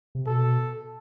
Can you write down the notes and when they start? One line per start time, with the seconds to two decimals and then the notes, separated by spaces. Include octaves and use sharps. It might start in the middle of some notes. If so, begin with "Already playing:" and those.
0.15 C3
0.26 B2 A4